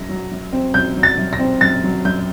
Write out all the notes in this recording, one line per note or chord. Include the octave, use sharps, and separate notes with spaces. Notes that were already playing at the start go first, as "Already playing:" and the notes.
Already playing: F#2 A#6
F#3
F#2
C4
F#2 G6
F#3
A6
F#2
A#6
C4
F#2 A6
F#3
F#2 G6